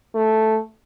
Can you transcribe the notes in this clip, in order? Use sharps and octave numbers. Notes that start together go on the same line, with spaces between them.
A3